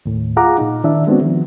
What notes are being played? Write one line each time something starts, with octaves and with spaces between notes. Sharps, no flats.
D#2 A2
F4 G#4 F5 F#5 A#5 D6
A#2 D#4
D#3 D4 E4 E5
G#3 B3 C4 D4 F#4
D#3 F3